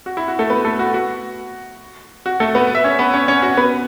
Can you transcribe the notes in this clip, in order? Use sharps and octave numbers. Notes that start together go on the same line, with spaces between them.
F#4
E4
F#4
A3 A4
B3 B4
A3 A4
F#4
F#4
F#4
A3 A4
B3 B4
E5
C#4 C#5
B3 B4
C#4 C#5
C#4 C#5
F#4
B3 B4